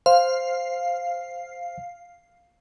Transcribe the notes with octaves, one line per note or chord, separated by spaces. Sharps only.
C5 F5